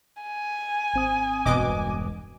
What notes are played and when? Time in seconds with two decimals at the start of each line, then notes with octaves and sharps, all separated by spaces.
0.23 G#5
0.94 G#1 C4 D#6
1.45 E1 G2 B2 D#5 D6